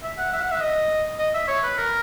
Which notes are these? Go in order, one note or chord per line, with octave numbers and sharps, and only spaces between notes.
E5
F#5
E5
F#5
E5
D#5
D#5
E5
C#5
B4
A#4